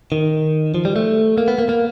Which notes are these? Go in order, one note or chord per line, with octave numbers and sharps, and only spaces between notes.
D#3
F3
G3
A3
A#3
B3
A#3
A#3